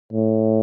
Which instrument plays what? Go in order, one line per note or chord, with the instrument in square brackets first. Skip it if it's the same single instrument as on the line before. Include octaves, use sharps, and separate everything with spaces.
[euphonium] A2